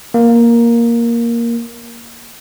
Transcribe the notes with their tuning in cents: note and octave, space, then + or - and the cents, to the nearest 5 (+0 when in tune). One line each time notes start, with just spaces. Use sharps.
A#3 +5